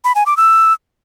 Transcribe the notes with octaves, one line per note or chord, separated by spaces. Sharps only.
B5
G#5
D6
E6